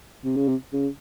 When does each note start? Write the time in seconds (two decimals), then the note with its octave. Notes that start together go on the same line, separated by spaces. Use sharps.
0.24 C3
0.37 C#3
0.48 C3
0.73 C#3